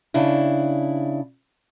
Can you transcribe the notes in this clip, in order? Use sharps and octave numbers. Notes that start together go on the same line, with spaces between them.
C#3 D4 E4